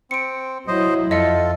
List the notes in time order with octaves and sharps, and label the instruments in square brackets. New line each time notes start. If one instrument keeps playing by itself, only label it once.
[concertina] C4 [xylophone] C#7 D7
[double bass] F#3 E4 [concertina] C5 D#5
[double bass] F2 [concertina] F4 A4 [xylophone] D#5 E5 C#7